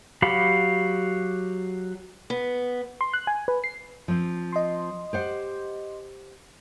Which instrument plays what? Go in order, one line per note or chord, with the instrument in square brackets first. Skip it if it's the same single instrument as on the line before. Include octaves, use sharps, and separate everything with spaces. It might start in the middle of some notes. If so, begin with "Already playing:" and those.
[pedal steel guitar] F#3 G4 F5 F#5 B5
[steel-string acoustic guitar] B3
[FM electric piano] C6
F#6
G#5
B4
C7
[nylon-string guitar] F3 C4
[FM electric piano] D#5 C6
[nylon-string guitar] G4 C5 F#5